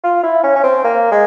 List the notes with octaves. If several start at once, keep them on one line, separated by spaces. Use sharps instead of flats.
F4
E4
C#4
C#4
C4
A#3
G#3